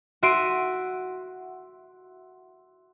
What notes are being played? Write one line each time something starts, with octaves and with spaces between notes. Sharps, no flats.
F#4 E5 C6 D7 D#7